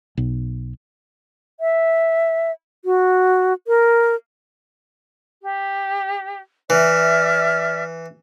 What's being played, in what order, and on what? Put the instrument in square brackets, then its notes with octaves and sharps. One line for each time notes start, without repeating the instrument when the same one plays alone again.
[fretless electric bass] B1
[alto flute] E5
F#4
A#4
[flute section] G4
[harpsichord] E3 [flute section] D5 E5 F6